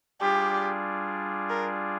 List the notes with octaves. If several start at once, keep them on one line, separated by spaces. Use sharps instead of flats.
G3 D4 F4 G4 G#4
A#4